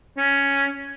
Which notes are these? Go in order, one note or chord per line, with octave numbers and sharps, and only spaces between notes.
C#4